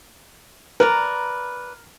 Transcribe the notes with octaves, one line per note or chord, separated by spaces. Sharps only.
A#4 B4 D5 A#5